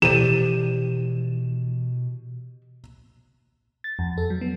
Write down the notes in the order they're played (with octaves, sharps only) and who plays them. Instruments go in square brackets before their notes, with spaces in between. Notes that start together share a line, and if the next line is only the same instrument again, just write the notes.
[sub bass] B2 [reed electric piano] E3 [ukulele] G4 C5 D5 [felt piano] D#7 E7
[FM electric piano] A6
F2
A4
F#3
B3